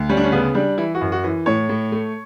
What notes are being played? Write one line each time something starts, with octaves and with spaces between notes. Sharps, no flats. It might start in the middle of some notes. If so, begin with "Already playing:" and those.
Already playing: D2
G3 C#4
D4
C#4
C#3 B3
G3 D4
E3 E4
F#4
F#2
F#4
E3
A2 C#5
A2
A3